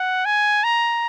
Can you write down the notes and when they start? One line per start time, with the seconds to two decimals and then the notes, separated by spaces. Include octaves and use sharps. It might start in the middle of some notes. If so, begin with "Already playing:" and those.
Already playing: F#5
0.25 G#5
0.64 A#5